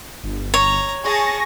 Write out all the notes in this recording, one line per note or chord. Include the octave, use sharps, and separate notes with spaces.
G1
C#5 A#5
G#4 G#5 A5 C#6 A#6